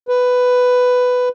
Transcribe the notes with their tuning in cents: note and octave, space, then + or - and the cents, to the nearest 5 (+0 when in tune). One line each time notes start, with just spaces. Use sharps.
B4 +10